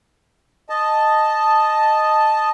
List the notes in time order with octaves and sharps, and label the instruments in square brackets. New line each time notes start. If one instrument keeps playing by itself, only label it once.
[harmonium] D#5 A5